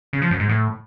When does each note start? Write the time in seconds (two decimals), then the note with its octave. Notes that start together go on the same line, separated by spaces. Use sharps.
0.13 C#3
0.22 F3
0.31 F#2
0.40 G#2
0.49 A2